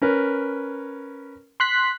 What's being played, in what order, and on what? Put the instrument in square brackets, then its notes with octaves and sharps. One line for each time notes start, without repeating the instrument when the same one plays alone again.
[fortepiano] C#4 A#4 B4
[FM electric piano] C6 F#6 B6